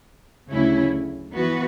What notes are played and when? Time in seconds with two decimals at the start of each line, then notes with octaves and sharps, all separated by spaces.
0.51 D2 C#3 F#3 C#4 E4
1.35 E3 B3 F#4 B4